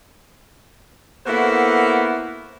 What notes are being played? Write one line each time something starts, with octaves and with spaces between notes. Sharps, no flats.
A#3 B3 E4 F#4 A4 C5